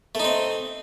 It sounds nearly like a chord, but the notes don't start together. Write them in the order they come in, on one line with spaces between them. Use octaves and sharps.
A3 D#4 C4